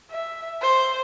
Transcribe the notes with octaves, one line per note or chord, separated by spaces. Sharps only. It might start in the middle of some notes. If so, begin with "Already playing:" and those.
E5
C5